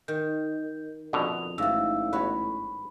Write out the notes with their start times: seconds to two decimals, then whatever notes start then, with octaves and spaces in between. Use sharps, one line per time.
0.08 D#3 G6
1.13 A#1 F2 B2 D3 D#6 F7
1.58 A1 G#2 F#3 E5 F5 E6
2.13 G1 F#4 B4 C#5 B5